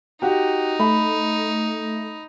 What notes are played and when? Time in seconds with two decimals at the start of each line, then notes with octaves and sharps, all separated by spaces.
0.22 D#4 F#4 G4
0.80 A3 B5